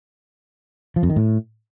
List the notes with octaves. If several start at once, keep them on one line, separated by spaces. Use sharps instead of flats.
F3
F2
D#3
A2